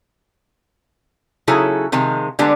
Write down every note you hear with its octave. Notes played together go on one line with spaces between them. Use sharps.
C#3 F#3 D#4 E4 G#4 A4
C3 D#3 F3 G#3
D3 G3 G#3 B3 D4 A#5